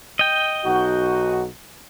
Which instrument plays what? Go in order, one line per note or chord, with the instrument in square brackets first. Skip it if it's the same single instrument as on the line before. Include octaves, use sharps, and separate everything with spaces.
[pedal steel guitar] D#5 G5
[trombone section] B1 D#4 F#4